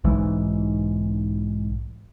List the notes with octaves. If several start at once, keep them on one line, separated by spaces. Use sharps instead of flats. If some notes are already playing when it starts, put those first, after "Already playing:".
B1 G#2 E3